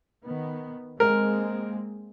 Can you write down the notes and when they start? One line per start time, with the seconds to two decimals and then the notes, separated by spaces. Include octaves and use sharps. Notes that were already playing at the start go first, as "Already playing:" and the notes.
0.25 D#3 B3
1.00 G#3 A#3 C4 A#4